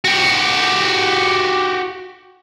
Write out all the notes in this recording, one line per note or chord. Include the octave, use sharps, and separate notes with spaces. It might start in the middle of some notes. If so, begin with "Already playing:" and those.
F#4 G4